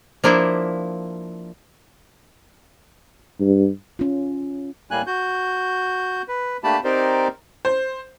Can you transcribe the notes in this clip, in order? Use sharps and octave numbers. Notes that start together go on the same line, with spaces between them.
F3 A#3 D4 E4
G2
C#4 F4
A2 G3 A#3 G#5 F#6
F#4 G6
B4
A3 A#3 D4 G4 A5 B5
C4 D#4 G4 A#4 C5 D5
C5